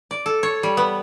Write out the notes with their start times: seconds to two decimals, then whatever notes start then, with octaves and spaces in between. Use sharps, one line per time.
0.11 D5
0.26 A4
0.43 C#5
0.63 G3
0.77 B3